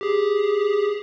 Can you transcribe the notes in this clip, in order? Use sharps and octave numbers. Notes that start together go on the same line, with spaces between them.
G4 G#4